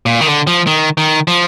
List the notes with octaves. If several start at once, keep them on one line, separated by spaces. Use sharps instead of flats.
A#2
D#3
D3
F3
D#3
D#3
F3